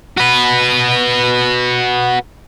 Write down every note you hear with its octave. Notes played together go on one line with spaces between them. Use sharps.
F#4 B4